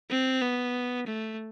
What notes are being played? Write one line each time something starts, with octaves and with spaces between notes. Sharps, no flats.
C4
B3
A3